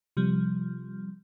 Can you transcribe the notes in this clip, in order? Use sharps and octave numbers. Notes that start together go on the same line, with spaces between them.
C3 F3 G3